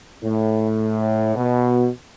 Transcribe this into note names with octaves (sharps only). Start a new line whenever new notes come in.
A2
B2